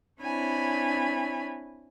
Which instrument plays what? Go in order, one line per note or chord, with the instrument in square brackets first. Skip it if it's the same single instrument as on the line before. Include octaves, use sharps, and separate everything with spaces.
[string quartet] C4 D4 E4 C#5 G#5 B5